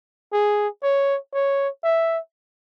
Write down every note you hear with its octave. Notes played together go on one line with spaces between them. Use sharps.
G#4
C#5
C#5
E5